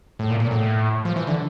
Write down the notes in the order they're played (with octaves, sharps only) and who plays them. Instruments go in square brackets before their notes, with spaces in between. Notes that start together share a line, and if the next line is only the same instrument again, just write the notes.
[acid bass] A2
A#2
A#2
A2
F3
E3
D3